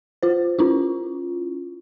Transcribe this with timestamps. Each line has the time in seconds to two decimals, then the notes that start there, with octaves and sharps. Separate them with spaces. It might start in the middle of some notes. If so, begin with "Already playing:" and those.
0.23 F4 C5
0.59 C#4 E4 F4